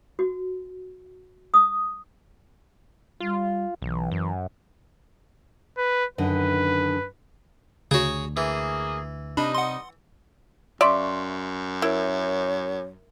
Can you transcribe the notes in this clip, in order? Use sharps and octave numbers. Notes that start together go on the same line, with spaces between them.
F#4
D#6
G3 F4
B1 E3
F#2
B4
F#2 D3 D#3 B4
D2 C#3 F#4 G#4 C#5
E3 A#3 G#4
C3 G3 D4 D#4 D#5 B5
F#5 C6
F#2 D5 E5 F5 C6 C#6
E4 A#4 B4 C#5